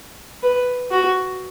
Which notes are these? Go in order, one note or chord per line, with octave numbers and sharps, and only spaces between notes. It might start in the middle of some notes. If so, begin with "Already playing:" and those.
B4
F#4